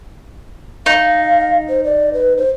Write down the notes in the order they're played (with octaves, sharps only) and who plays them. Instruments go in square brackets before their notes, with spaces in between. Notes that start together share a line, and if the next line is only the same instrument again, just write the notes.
[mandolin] D#4 [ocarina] F5
[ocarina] C5
D5
B4
C5